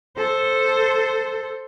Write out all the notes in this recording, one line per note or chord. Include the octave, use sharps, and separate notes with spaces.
A4 C5